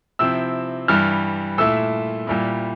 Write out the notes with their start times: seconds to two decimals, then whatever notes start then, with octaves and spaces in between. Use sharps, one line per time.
0.19 C3 F3 C4 E4 E6
0.88 G2 E3 G3 F6
1.58 A#2 A3 E4 E6
2.27 A#2 G3 A#3 E4